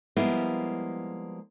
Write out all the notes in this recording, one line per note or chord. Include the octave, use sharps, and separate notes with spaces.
F3 G3 G#3 A#3 B3 E4